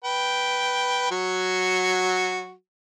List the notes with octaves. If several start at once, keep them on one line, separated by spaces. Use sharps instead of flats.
B4 G5
F#3 F#4